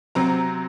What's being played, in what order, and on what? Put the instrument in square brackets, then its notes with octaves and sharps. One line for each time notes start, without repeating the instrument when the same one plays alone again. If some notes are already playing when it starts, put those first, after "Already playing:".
[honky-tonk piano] C3 F#3 C4 A#5